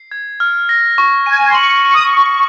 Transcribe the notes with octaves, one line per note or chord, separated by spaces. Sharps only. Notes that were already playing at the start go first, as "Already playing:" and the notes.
Already playing: C7
G#6
F6
A#6
C#6
G#5 D#7
C6
C#6 F#7
C#6 D#7
D#6
C#6
D#6